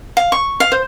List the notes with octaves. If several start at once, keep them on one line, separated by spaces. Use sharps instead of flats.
F5
C#6
F5
C5